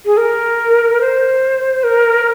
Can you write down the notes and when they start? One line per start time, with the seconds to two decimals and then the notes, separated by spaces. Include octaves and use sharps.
0.06 G#4
0.17 A#4
1.01 C5
1.83 A#4